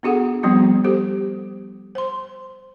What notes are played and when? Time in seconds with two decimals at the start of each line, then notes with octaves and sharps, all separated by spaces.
0.03 B3 D4 F#4 G#4 A4 F#5
0.43 F3 G3 B3 C4 D4 F#4
0.84 G4 A4 C5
1.95 C5 C6